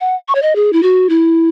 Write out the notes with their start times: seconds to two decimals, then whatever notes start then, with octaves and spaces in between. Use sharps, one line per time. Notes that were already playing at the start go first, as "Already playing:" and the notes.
0.01 F#5
0.28 C#6
0.35 C#5
0.42 D#5
0.56 G#4
0.73 E4
0.83 F#4
1.09 E4